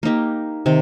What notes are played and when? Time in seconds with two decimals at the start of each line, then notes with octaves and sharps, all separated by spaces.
0.03 A#3 D#4 G4
0.66 C3 D#3